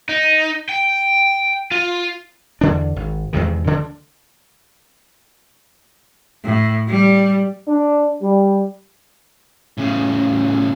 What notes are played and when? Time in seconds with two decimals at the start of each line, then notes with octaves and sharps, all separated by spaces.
0.09 D#4
0.69 G5
1.72 F4
2.61 E2 D3 D4
2.96 G#1
3.33 E2 G#2 C3 D#3
3.66 D2 D3 D4
6.45 A2
6.89 G3
7.68 D4
8.22 G3
9.78 A2 C#3